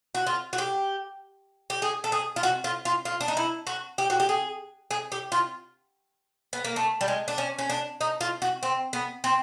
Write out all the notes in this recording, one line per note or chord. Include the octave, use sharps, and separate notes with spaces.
F#4
F4
F#4
G4
G4
G#4
A4
G#4
F4
F#4
F4
F4
F4
D4
D#4
E4
F#4
G4
F#4
G4
G#4
G#4
G4
F4
B3
A#3
A3
G3
G#3
D4
C#4
C#4
D4
D#4
F4
F#4
C4
B3
C4